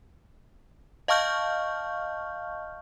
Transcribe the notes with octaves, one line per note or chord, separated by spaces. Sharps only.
D#5 F5 A5 C#6 F6 G6